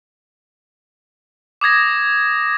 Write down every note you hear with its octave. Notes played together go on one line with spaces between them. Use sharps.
D6 D#6 G#6 A#6